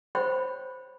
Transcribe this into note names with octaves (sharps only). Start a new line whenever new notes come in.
C5 C#5 G5 B5